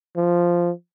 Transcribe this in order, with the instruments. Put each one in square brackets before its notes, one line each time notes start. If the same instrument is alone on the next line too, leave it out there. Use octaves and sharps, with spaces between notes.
[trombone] F3